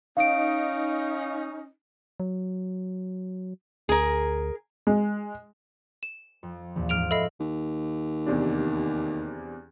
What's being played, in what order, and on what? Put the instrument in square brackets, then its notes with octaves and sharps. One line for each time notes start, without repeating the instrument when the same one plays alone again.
[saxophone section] C#4 D#4 [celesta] F5 D7
[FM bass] F#3
[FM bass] D2 [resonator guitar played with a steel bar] G#4 A#4
[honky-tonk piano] G#3
[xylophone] E7
[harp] F2
[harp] A#1 [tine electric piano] D#2 E3
[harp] G#2 F3 [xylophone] F6 D7 F7
[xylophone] A4 D#5 [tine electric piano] E5 B5 C7
[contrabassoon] D#2
[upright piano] E2 C3 D4